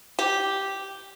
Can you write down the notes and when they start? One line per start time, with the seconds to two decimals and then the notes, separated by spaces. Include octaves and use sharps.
0.19 G4